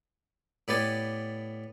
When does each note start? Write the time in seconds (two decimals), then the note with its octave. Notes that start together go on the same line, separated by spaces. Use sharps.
0.68 A2 B3 G4 D5 G#5